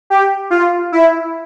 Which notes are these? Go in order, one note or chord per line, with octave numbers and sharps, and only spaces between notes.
G4
F4
E4